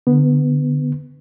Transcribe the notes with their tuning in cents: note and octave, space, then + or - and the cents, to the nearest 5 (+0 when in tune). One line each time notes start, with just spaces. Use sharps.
D3 +0 B3 +0